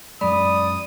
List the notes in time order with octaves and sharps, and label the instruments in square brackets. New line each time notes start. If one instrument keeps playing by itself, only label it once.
[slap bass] F#2 G#3 [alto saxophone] D5 [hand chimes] B5 [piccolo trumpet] D#6